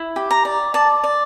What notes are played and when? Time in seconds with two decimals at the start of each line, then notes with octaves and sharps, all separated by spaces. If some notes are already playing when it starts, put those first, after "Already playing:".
Already playing: E4
0.16 G4
0.31 A#5
0.45 D5
0.74 D5 A5
1.04 D5